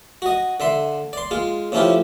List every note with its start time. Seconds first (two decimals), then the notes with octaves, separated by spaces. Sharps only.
0.22 F#4 D#5
0.60 D3 E5 C6
1.13 D5 C6
1.31 G#3 F4
1.72 A2 F3 C#4 E4 F4 G4